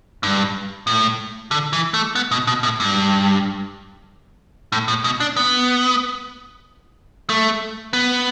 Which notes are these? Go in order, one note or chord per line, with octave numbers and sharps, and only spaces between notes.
G2
A2
D3
E3
A3
B3
B2
B2
A2
G2
A2
A2
B2
D4
B3
A3
B3